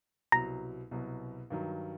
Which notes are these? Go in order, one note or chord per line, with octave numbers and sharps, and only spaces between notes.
C2 B2 F#3 A#5
C2 B2 F#3
G2 D#3 F#3